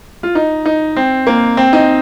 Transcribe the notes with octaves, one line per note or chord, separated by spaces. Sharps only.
F4
D#4
D#4
C4
A#3
C4
D#4